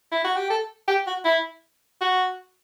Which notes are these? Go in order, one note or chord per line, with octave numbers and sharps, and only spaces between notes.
E4
F#4
G4
A4
G4
F#4
E4
F#4